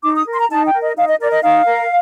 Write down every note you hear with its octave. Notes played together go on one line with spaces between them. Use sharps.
D#4 D6
D#6
A#4
C6
A#5
D#4 A5
G5
A#4
D#5
D#4 F5
D#5
A#4 D5
D#5
D#4 F5
A#4